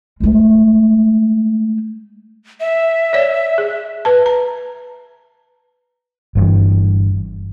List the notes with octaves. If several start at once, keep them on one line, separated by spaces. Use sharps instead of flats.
G#3 A3
E5
C#5 D5
G#4
B4 A5
A#5
G1 G2 E3